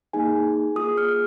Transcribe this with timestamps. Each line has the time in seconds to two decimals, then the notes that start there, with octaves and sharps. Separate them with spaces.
0.13 A#3 D#4 G#4 G#5
0.76 A#3 F4 G#4 D#6
0.98 F6